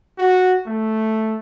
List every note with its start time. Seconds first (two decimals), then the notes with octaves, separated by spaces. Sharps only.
0.18 F#4
0.66 A3